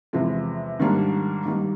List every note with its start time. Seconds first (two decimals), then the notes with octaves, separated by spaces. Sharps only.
0.13 E2 C3 F3 G#3
0.79 G#2 D#3 G3 A#3 D4
1.46 G2 D#3 G3 A#3 D#4